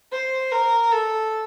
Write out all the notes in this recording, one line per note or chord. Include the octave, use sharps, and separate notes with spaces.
C5
A#4
A4